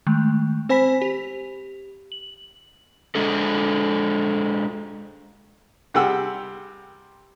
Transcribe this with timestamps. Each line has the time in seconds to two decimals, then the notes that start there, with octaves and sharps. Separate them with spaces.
0.07 D#3 G#3 A3
0.69 C4 C5 G#5 B5 B6
1.02 G4
2.12 F#7
3.15 G#3 D4 A4
5.94 C3 G3 G#4 F#5 G5 E6